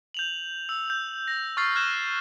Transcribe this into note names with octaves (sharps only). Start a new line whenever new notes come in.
G6 F7 F#7
E6
G6
A#6
C#6 F6 A6 C7
F6 F#6 G#6 E7